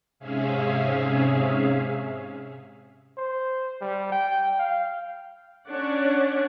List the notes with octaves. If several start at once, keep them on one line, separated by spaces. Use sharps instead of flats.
G#2 C3 C#4 G#4 E5 F5
C5
G3
G5
F5
C#4 D4 C#5 D5 F#5